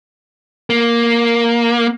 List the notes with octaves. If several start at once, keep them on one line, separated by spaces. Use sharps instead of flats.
A#3